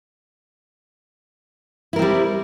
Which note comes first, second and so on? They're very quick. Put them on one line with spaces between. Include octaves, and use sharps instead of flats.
E4 A#4 C4 G3